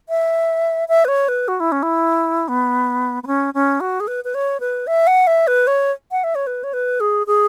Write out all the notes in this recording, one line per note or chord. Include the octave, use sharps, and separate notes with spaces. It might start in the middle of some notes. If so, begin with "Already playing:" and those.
E5
E5
B4
C#5
B4
F#4
E4
C#4
E4
B3
B3
C#4
C#4
F#4
G#4
B4
B4
C#5
B4
E5
F#5
E5
B4
C#5
F#5
E5
C#5
B4
C#5
B4
G#4
G#4